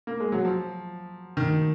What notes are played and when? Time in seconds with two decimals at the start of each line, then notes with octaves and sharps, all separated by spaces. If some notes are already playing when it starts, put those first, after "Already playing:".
0.07 A#3
0.20 G#3
0.32 F#3
0.45 F3
1.37 D#3